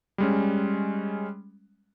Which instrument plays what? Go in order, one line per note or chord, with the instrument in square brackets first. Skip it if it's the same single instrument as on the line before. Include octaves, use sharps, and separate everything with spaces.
[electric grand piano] G3 G#3 C#4